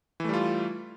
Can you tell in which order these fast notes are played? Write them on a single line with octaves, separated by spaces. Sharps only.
E3 A3 G3 F4